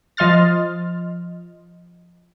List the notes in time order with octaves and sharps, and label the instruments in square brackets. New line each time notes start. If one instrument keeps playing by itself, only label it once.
[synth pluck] F3 D#5 C6 F6 A6